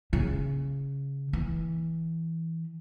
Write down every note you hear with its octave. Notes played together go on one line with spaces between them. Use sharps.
C#3
E3